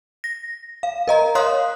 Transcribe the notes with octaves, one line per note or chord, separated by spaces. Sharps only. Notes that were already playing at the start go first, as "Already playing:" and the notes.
A#6
F5
A#4 D#5 A#5
C#5 F5 C6 D#6 F#6